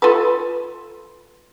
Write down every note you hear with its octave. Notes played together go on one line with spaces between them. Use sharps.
F4 A4 B4